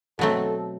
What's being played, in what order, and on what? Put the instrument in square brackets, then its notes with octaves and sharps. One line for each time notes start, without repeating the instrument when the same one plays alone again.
[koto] B2 F#3 A3 C4 [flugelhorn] A4